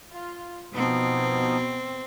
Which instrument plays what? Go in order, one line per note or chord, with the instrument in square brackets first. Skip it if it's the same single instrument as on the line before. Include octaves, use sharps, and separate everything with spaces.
[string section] F4
[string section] B2 [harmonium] F3 B3 D#4 [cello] C4